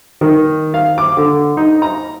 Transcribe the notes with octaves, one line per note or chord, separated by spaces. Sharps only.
D#3
F5
D6
D3
D#4
A#5